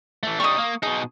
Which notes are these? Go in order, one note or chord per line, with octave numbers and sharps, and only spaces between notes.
E3 A3
G3 D#4 C#6 D#6
A#3
B2 D#4 G#4